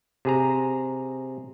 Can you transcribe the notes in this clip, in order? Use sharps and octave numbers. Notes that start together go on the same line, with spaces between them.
C3 G#4 A#5